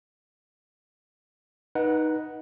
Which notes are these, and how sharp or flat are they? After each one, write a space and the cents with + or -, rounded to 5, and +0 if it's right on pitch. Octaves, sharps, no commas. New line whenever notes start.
D#4 +0 B4 -25 F#5 +0